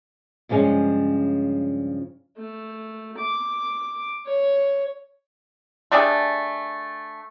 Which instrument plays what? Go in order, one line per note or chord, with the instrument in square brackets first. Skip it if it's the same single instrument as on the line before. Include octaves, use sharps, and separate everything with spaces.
[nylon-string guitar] G2 C#3 F3 G#3 C#4
[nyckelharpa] A3
D6
C#5
[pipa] A3 D4 G4 G#4